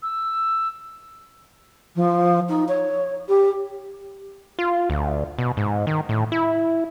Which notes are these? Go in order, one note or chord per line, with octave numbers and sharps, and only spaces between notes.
E6
F3
D#4
C#5
G4
F4
D2
B2
G#2
D#3
A2
E4